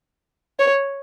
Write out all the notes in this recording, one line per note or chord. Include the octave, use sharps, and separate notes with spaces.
C#5